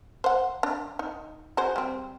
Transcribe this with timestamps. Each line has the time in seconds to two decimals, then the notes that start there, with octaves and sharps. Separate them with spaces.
0.24 C5 F#5
0.63 D4
0.99 D#4
1.57 F#4 G#4 C5
1.76 G3 C4